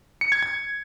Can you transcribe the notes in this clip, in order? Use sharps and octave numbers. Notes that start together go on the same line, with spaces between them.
C#7
G#6
G#6